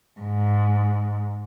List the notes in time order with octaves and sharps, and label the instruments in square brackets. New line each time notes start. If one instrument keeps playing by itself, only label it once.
[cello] G#2